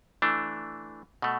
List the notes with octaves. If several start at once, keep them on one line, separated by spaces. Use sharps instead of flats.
E3 A3 D4
B2 A3